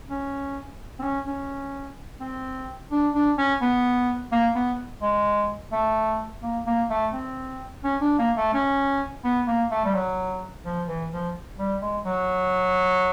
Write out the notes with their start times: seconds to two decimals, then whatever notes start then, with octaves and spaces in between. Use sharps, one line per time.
0.10 C#4
1.00 C4
1.03 C#4
1.27 C#4
2.21 C4
2.92 D4
3.15 D4
3.38 C#4
3.62 B3
4.32 A#3
4.55 B3
5.02 G#3
5.72 A3
6.43 A#3
6.67 A#3
6.90 A3
7.13 C4
7.84 C#4
8.02 D4
8.19 A#3
8.37 A3
8.54 C#4
9.25 B3
9.48 A#3
9.71 A3
9.85 G3
9.95 F#3
10.65 F3
10.88 E3
11.12 F3
11.59 G3
11.82 G#3
12.06 F#3